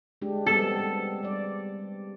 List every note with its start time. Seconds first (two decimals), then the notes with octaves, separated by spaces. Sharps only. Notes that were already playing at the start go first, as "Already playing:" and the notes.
0.22 G#3 D4 G4
0.46 G3 B3 C4 A4
1.23 G3 D5